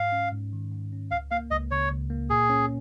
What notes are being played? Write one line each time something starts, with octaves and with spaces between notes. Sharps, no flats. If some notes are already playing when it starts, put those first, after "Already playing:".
Already playing: G#2 F5
C#4
G#2
D#3
G#2
C#4
C#2 F5
A#3 F5
C#2 D#5
C#3 C#5
C#2
A#3
A#2 G#4
C#4